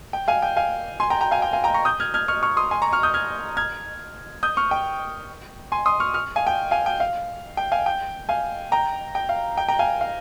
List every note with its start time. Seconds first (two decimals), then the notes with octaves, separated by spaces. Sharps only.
0.13 G5
0.28 F5 G#5
0.42 G5
0.56 F5 G#5
1.00 G#5 C6
1.10 G5 A#5
1.21 G5 A#5
1.31 F5 G#5
1.42 G5
1.53 F5 G#5
1.64 G5 A#5
1.74 A#5 C#6
1.85 D#6 G6
2.00 F6 G#6
2.14 F6 G#6
2.28 C#6 F6
2.43 C#6 F6
2.57 C6 D#6
2.71 G#5 C6
2.82 A#5 C#6
2.93 C#6 F6
3.03 D#6 G6
3.14 F6 G#6
3.57 F6 G#6
4.43 D#6 G6
4.57 C#6 F6
4.71 G5
5.72 G#5 C6
5.86 C6 D#6
6.00 C#6 F6
6.14 C#6 F6
6.36 F5 G#5
6.47 G5
6.71 F5 G#5
6.86 G5
7.00 F5
7.57 G5
7.72 F5 G#5
7.86 G5
8.29 F5 G#5
8.72 G5 A#5
9.15 G5
9.29 F5
9.58 G5
9.68 G5 A#5
9.79 F5 G#5
10.01 F5